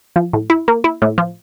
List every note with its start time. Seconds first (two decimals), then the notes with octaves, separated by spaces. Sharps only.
0.16 F3
0.33 A2
0.50 E4
0.68 A#3
0.84 E4
1.02 A2
1.18 F3